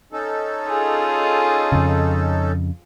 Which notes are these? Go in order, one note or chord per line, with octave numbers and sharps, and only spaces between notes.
C#4 D#4 A4
F4 G#4
F2 C#3